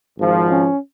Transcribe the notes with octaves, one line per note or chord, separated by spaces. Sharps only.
G#1 G#2 F3
C#4